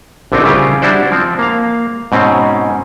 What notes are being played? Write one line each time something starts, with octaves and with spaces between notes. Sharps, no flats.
A#1 D3 B3 C4 D#4 G5
C#3 G3 E4 F4 G4
G3 D4 E4 F#4 C5 D5
F3 C4
A#3 F5
G#2 B2 C4 C#4